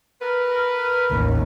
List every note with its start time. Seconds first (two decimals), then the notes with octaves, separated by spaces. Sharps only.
0.22 A#4 B4
1.11 A1 D#2